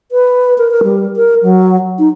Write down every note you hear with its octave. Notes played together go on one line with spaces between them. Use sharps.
B4
A#4
A#4
G3
A#4
F#3
D#4